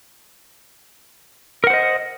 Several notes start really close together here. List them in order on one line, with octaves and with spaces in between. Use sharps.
A#4 F#5 C5 D#5